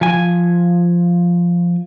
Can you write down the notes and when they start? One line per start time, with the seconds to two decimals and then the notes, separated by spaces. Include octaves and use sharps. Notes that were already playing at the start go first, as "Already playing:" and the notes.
0.01 F3 G#5